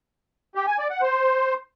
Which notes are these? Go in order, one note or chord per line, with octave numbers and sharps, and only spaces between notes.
G4
G#5
D5
F#5
C5